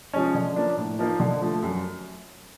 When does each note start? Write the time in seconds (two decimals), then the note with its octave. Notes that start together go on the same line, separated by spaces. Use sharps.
0.13 F3 G#3 C#4
0.34 D3
0.56 F3 A#3 D4
0.77 A2
0.99 F3 A#3 D#4
1.20 D3
1.41 F3 A3
1.63 F#2